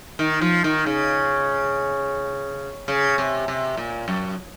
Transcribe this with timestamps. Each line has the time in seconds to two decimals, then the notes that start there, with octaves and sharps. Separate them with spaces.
0.19 D#3
0.41 F3
0.64 D#3
0.86 C#3
2.88 C#3
3.18 C3
3.48 C3
3.77 A#2
4.08 F#2